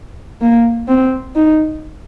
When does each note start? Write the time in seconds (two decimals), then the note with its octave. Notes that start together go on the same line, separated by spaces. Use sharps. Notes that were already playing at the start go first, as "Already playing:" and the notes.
0.42 A#3
0.88 C4
1.36 D#4